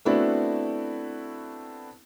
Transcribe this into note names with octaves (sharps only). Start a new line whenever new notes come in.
A3 B3 C4 D4 E4 F#4